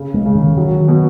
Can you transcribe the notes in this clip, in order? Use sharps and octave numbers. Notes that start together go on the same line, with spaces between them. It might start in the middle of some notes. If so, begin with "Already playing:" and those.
Already playing: C#3
G#3
C#3
D#3
D#3 F#3
B2